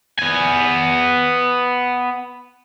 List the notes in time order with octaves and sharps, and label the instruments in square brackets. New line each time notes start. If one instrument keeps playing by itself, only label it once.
[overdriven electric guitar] B3 G#5